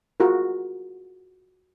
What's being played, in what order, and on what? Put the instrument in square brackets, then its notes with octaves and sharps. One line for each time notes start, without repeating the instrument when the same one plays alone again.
[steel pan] F4 F#4 G#4 A#4